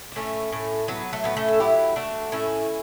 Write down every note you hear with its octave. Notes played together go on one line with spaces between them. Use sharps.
D4
A2 A3 C#4
A2
F#3 B3
A3
A2 B3
A3 C#4
A4
F#3 E4 G4
A3 D4 F#4
A2 C#4 E4